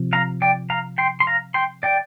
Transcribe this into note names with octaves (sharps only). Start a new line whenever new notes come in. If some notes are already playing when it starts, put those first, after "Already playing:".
Already playing: C3 F3
F5 A#5
D5 G5
F5 A#5
G5 C6
C6
F5 A#5
G5 C6
D5 G5